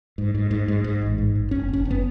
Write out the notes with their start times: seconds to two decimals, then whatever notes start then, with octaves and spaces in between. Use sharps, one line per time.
0.18 G#2
0.34 G#2
0.51 G#2
0.68 G#2
0.84 G#2
1.02 A1
1.18 G#2
1.35 A1
1.51 F#1 C#4
1.69 F#1 C#4
1.85 F#1
1.91 B3